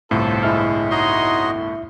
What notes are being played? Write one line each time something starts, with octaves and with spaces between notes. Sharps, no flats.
G1 C2 A2 C4 F4 A4
G#3 E4 E5 F6
D#4 F#4 C#5 D#5 C6